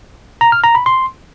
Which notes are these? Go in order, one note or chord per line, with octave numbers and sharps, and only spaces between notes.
A#5
F6
A#5
B5
C6